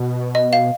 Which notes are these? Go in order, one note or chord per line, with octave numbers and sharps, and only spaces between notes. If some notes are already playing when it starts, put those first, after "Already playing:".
Already playing: B2
D#5
F5